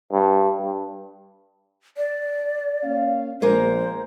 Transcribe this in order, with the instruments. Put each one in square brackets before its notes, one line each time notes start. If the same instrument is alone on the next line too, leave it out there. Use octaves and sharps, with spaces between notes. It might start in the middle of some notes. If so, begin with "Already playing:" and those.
[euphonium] G2
G2
[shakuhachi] D5
[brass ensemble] A#3 C#4 F5
[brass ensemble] A#1 [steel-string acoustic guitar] G#3 A#3 A#4 [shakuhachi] C5